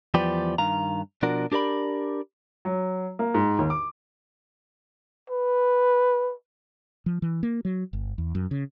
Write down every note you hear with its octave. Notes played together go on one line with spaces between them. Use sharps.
E2 F3 G3 G4 B4 D5
G2 D#3 F5 A#5
B2 F3 D4 F#4 A#4
D4 G4 A#4 D5 B5
F#3
A#3
G#2
D#2
D6
B4
F3
E3
A#3
F#3
G1
E2
F#2
C#3